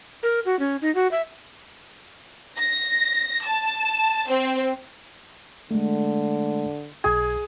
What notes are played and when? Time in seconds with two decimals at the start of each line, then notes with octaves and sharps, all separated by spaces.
0.23 A#4
0.46 F#4
0.59 C#4
0.82 D#4
0.95 F#4
1.11 E5
2.58 A#6
3.45 A5
4.30 C4
5.71 D3 G#3 A3
7.04 B1 G#4 G#6